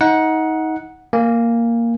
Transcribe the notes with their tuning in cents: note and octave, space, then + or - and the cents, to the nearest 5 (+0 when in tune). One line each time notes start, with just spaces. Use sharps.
D#4 +25 F#5 -5
A#3 -5 G#5 -30